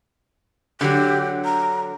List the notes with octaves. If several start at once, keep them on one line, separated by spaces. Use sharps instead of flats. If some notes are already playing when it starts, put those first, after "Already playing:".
D3 F#3 G4
A#5